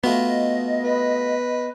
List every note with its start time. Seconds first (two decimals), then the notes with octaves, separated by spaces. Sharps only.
0.04 A3 B3 F4 F#4 D#5
0.84 B4